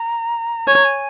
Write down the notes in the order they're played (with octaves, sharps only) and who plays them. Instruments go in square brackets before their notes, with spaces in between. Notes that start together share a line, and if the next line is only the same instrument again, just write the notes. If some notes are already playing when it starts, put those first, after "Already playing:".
Already playing: [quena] A#5
[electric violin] C#5 [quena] G#5
[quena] A#5
G#5